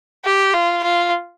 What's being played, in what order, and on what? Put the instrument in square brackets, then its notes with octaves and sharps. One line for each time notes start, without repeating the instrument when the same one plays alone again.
[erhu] G4
F4
F4